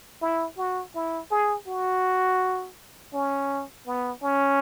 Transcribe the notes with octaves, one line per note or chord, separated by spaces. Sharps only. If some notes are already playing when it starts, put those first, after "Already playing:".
E4
F#4
E4
G#4
F#4
C#4
B3
C#4